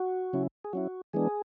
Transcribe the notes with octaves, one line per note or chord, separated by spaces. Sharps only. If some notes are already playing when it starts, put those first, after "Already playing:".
Already playing: F#4
C#3 F#3 C#4 E4
G#4
F#3 C#4 E4 F#4
E3 G#3 B3 D4 G#4